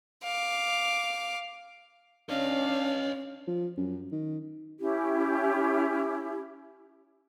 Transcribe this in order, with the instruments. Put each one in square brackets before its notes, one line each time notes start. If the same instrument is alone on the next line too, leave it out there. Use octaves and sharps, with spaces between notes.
[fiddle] F5 D6
[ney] C#4 [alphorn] D4 [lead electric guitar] C#5 D#5 [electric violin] F5
[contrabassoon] F3
F#2
D#3
[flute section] C#4 E4 G4